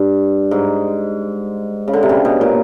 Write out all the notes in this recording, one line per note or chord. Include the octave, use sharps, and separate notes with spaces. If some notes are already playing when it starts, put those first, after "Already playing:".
Already playing: G2
G#2
C#3
D3
C3
C#3
B2
A#2